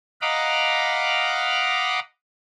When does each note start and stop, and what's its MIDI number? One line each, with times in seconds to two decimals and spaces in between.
0.21 1.99 75
0.21 1.99 77
0.21 1.99 78
0.21 1.99 82
0.21 1.99 83
0.21 1.99 86